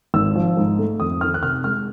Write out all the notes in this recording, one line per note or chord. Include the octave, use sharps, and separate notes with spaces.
G#1 E6
F3
G#2
A3
F2 D#6
D#3 F6
F#6
C3 F6
G#3 F6